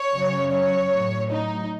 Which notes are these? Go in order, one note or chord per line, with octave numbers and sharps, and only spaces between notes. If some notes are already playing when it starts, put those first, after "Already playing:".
Already playing: C#5
F#2 C#3 F#3
C#5
A2 F#3
D#4